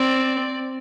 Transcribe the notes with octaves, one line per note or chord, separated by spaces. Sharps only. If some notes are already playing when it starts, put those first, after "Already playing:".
Already playing: C4 D5